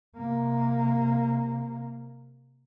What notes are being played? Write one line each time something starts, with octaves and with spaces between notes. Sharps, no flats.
C3 A#3